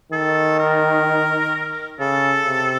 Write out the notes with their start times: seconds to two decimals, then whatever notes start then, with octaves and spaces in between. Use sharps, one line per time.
0.12 D#3 A4
0.59 A#4
1.99 C#3 A4
2.46 C3